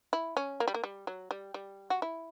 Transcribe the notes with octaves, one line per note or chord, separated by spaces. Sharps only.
E4
C#4
A#3
G3
A#3
G3
F#3
G3
G3
F#4
E4